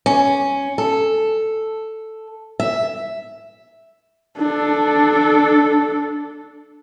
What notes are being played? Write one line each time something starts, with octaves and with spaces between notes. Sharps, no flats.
C#4
A4
E5
D4 A4